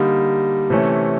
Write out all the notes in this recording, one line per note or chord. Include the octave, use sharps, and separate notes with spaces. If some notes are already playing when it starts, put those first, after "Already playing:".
Already playing: D3 G3 A#3 D#4
C3 E3 A3 C#4